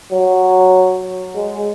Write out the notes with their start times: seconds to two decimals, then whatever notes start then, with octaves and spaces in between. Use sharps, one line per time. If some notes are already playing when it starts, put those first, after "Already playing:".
0.11 F#3
1.35 G#3